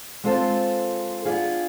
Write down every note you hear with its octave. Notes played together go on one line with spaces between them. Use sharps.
G#3 C4 F4 A4 C5
B3 D4 F4 G#4